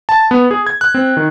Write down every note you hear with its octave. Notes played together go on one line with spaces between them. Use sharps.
A5
B3
G#4
G#6
F#6
C4
D#3